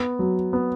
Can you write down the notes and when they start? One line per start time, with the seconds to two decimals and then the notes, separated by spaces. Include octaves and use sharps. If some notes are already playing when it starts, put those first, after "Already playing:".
Already playing: B3
0.19 F#3
0.53 B3